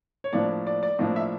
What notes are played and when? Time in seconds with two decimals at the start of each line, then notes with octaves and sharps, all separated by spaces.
0.24 C#5
0.33 A2 F3 A#3 D4 D5
0.67 D5
0.83 D5
0.98 A2 F3 A#3 D4 D#5
1.16 E5